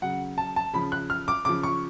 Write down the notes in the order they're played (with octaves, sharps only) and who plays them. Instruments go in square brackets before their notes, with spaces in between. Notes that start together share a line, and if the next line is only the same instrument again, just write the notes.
[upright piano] C#3 F#3 F#5
A5
A5
C#3 F3 B5
F#6
F6
D6
C#3 F3 D6
C#6